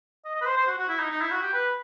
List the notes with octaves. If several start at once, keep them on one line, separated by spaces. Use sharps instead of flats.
D#5
D#5
B4
C5
C5
F#4
F#4
E4
D#4
D#4
E4
F#4
G4
B4